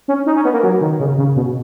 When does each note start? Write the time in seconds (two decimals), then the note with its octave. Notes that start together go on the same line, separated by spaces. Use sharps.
0.08 C#4
0.26 D#4
0.36 C#4
0.45 B3
0.53 A#3
0.63 F#3
0.81 D#3
1.00 C#3
1.18 C#3
1.36 B2